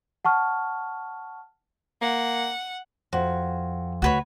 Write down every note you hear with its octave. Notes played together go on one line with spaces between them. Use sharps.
F#5 A5 C#6 F6
A#3 F#5
F2 F#4
D2 F#4 B4 C#5